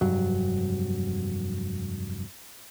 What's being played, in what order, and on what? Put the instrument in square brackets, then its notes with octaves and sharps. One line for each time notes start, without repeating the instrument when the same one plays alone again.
[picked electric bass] F1 G2 F#3